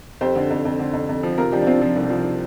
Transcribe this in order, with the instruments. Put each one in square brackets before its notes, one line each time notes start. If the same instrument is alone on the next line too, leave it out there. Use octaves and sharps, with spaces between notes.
[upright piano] F2 G4 C5
D3
F2
F2
D3
F2
F2
F3
C3 F4 A#4
F3 D4 G4
D4
C3 C4 F4
F3
C2
F3